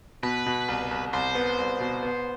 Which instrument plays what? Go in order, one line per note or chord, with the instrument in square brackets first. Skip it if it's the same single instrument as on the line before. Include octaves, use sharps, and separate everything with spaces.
[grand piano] B2 [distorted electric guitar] B4
[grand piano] B2
C2
C2
[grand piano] C2 [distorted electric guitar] C5
[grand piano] B3
C2
B2
B3